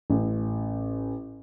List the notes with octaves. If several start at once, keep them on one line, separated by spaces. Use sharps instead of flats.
A1